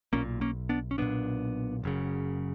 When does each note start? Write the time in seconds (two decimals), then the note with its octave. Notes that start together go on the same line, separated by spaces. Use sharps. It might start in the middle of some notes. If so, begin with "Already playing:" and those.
0.13 B1 A#2 A#3 C#4
0.41 A#3 C#4
0.69 B3 D4
0.91 C#4
0.98 B1 A#2 B3 D4
1.84 F#1 F#2 C#3